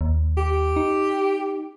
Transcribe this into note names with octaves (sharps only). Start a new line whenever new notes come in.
D#2
G4
D#4